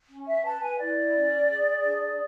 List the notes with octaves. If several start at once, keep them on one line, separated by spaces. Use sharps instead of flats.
C#4
E5
B4 A5
G#5
E4 D5
C#4
G#4
D4